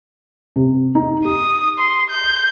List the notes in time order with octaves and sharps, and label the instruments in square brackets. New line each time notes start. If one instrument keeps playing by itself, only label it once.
[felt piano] C3
D#4
[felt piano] G4 [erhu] D#6
[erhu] C6
G6